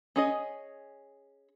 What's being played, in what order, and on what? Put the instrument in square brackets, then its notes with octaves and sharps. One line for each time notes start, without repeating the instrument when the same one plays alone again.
[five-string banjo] C#4 G#4 D#5